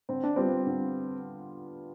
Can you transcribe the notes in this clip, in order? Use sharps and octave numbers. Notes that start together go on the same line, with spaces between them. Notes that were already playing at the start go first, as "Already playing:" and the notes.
D3 C4
D4
G3 B3 C4 F4
D3